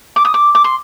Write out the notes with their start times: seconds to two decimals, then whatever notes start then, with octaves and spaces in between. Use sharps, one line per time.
0.16 D6
0.25 D#6
0.34 D6
0.55 D6
0.64 C6